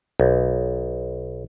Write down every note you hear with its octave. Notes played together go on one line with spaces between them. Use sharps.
B1